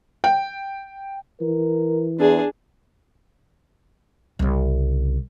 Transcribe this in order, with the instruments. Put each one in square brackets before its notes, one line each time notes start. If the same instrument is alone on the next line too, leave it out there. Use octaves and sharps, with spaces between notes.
[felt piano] G5
[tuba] E3 [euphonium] A#4
[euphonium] E2 [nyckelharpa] D4 G#4
[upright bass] C2 C#3